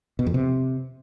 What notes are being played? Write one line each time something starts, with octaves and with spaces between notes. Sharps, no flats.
B2
F2
C3